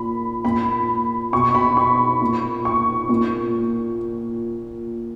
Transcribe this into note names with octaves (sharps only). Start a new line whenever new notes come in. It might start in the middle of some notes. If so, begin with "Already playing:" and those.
Already playing: A#2 B5
A#2 B5
B2 C#6
B5
C#6
A#2
C#6
A#2